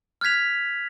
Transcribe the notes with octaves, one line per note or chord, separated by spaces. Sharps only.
F6 F#6 G#6 B6 F7